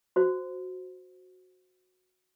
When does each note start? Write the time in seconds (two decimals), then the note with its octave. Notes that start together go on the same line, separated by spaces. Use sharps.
0.16 F#4 C5